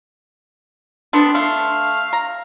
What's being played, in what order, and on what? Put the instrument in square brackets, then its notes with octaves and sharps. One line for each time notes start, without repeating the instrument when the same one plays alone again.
[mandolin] B3 D4 [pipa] C4
[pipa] A3 [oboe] F5 [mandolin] C6
[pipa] A#5